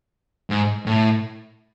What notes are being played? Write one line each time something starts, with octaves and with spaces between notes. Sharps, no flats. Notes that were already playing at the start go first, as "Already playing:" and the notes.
G#2
A2